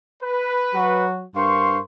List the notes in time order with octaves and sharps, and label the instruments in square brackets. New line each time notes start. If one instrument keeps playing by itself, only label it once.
[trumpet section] B4
[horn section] F#3 F#4
[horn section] G2 A#4 C6 [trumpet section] C5 F5 C#6